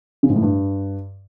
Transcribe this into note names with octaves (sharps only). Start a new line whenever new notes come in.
C#3
G#2
A2
G2